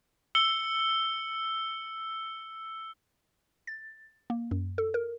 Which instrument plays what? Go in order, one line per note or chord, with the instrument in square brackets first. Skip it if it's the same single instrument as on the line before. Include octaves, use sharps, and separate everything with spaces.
[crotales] E6 C#7 G7
[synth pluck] A6
A#3
F#2
A4
A#4